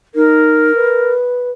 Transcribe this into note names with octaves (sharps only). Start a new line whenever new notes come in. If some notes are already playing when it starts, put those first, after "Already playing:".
D#4 A#4
B4